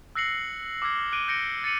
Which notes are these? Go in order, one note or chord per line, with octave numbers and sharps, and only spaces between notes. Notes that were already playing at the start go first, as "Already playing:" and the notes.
E6 F#6 A#6 C7 C#7 F#7
D6 E6 F6 G#6 C7
D6 F#6 D7 D#7 G7
G6 A#6 C#7 D7 G7
A6 C#7 D#7 F#7